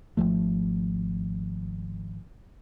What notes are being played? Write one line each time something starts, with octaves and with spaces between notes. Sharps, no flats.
G#1 E2 F3 A3